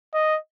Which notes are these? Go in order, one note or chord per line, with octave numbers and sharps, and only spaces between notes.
D#5